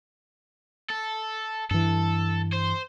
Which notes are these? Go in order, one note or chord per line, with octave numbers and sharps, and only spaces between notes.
A4
G2 E3 A4
C5